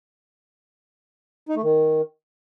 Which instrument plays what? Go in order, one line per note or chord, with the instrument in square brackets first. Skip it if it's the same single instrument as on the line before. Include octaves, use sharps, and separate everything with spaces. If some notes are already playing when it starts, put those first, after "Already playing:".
[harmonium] D#4
A3
D#3